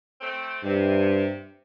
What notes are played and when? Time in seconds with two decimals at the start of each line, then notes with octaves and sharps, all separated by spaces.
0.21 A3 C4
0.64 G2 C3